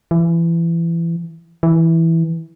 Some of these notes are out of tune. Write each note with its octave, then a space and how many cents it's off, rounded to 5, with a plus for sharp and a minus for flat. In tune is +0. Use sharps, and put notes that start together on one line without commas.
E3 +25
E3 -5